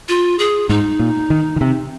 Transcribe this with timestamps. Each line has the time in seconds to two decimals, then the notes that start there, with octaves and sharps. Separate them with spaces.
0.09 F4
0.39 G#4
0.69 G#2 D#4
1.00 A#2
1.30 D#3
1.56 D#3
1.61 C3